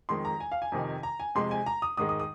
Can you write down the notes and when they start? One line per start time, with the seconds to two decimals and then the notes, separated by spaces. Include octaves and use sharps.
0.09 F2 D#3 G#3 C6
0.25 A#5
0.40 G#5
0.52 F5
0.62 G#5
0.72 F2 C3 D#3
1.03 A#5
1.20 G#5
1.35 F2 C3 G#3 C6
1.51 G#5
1.66 A#5
1.82 D#6
1.97 G#2 D#3 G#3 D#6
2.09 D#6
2.20 D#6